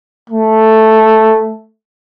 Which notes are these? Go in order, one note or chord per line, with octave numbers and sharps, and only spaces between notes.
A3